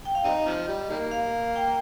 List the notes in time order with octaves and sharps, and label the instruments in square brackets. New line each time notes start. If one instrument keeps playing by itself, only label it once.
[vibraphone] G5
F5
[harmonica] G3 C4 D#4 [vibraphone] D#5
[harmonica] C3 F3
G3
D#3 G3 A#3
[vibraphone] F5
G5